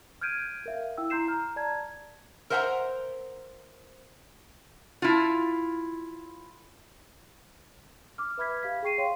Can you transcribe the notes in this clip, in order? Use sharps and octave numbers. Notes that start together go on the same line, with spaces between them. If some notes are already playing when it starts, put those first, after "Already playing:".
F6 G6 G#6 D7 D#7
A#4 E5 F5
E4 G5 E6
E4 A#5 C6 G6 C7 E7
A#5 F6
D5 A5 A#5 G#6
A#4 C5 E5 F#5 A5 A#5
E4 F4
D6 F6
B4 E5 B5 F6 G#6 B6
G4 F5 B6
G#4 G5 C#6 C7 D#7
C#5 F5 G5 C6